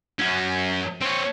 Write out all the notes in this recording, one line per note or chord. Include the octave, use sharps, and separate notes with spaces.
F#2 C#4
C4 C#5